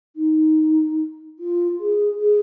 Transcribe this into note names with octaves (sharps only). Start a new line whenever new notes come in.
D#4
F4
G#4
G#4